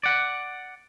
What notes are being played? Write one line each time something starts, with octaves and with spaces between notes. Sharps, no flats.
D5 F#5